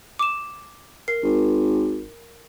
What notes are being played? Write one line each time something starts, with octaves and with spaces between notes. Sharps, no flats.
D6 E7
A#4 C7
G#1